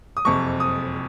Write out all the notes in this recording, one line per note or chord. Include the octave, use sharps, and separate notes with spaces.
D#6
F#1 F2 C3 C#6
D#6